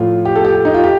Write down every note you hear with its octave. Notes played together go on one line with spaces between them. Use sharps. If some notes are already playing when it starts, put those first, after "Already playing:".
Already playing: A2 F3 A3 F4
G4
A4
G4
G4
D#4
F4
G4